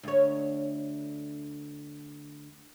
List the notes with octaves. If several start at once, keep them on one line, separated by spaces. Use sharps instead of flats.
D2 C#5